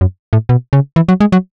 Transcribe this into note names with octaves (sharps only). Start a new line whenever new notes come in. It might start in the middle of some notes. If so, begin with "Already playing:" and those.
F#2
A2
B2
C#3
E3
F#3
G#3
F#3